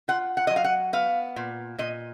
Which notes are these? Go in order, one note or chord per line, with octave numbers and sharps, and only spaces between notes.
F4 F#5
F#5
F#3 D#5
F5
F#5
B3 F5
A#2
A#2 D#5